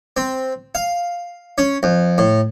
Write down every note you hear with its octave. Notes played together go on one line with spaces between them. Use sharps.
C4
F5
C#4
F2
A2